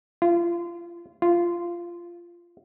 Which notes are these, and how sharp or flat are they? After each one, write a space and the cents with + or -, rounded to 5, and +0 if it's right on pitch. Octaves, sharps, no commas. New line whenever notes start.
F4 -30
F4 -15